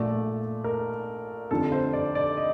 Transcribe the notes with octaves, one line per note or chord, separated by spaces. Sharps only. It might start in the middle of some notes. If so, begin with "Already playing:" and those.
Already playing: A#1 A#2 A3 D5
A#4
F1 F2 D3 F3 A4
C5
D5
D5
D#5